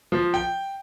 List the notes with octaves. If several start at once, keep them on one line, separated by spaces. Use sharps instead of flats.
F3
G5